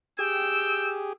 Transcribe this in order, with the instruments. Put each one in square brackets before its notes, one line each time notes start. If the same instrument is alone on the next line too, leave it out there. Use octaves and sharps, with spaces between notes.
[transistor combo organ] G4 G#4 [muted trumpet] G5 [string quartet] E6